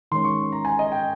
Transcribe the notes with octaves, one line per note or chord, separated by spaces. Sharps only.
D#3 G#3 C#4 C6
C#6
A#5
G#5
D#5
G5